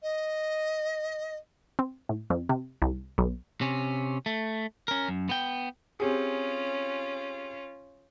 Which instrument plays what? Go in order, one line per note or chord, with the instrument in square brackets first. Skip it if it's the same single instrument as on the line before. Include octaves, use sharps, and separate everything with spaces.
[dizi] D#5
[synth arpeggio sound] C4
A2
F2
C3
C2
B1
[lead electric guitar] C3 C#4
A3
C#4 A#4
F#2
B3 G5
[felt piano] C4 G4 G#4 [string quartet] C#4 F4